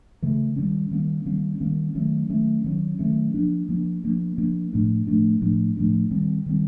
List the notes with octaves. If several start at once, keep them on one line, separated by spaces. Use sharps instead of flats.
C#3 E3 A3
D#3 G3 A#3 C#4
D#3 G3 A#3 C#4
D#3 G3 A#3 C#4
D#3 G3 A#3 C#4
D#3 F#3 A3 C#4
D#3 F#3 A3 C#4
D#3 F#3 A3 C#4
D#3 F#3 A3 C#4
F3 A#3 D4
F3 A#3 D4
F3 A#3 D4
F3 A#3 D4
A2 F3 A3 D4
A2 F3 A3 D4
A2 F3 A3 D4
A2 F3 A3 D4
D#3 G3 C4
D#3 G3 C4